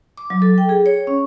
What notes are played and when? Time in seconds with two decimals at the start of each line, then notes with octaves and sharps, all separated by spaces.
0.17 D6
0.30 F#3
0.42 A4
0.58 G5
0.69 G#4
0.86 C#5
1.07 C#4